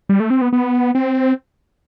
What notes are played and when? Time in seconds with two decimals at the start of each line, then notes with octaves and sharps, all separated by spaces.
0.09 G3
0.20 A3
0.30 C4
0.41 B3
0.53 B3
0.95 C4